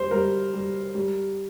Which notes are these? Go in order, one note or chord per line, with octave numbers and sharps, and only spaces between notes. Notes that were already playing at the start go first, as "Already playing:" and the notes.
Already playing: G3 C5
G3 A#4
G3
G3